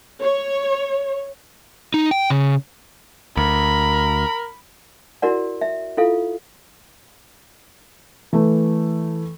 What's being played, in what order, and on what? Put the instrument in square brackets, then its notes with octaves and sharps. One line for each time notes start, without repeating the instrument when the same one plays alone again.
[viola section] C#5
[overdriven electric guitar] D#4
G5
C#3
[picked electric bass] D2 [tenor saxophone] A#4 [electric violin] B5
[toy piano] E4 F#4 A#4 D5 F#5
E5
E4 F4 A4 F5
[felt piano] E3 A3